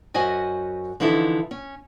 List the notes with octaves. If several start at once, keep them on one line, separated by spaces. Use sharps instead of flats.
F#2 C#4 F#4 C5 D#5 G#5
D3 E3 F3 D#4 E4 A4
C#4